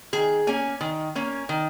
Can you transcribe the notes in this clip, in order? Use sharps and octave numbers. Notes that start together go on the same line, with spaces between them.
D#3 G#4
A#3 C#4 G#5
D#3
A#3 C#4
D#3